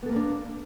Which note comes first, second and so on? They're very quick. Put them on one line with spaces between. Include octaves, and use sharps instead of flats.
B3 A4 A#3 B4 D4